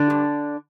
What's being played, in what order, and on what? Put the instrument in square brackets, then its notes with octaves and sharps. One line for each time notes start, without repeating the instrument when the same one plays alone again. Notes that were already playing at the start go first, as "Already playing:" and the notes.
Already playing: [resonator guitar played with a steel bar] D3 D4
G2